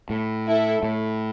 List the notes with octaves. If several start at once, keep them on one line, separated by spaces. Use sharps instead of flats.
A2
E4 A4 E5
A2